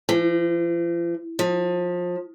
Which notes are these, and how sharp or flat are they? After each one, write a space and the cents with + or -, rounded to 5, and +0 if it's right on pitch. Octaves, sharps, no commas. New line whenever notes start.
F3 -45
F3 +25